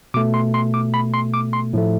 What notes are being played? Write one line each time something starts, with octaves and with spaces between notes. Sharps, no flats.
B2 A3 D6
C6
C6
D6
B5
C6
D6
C6
A2 F3 A3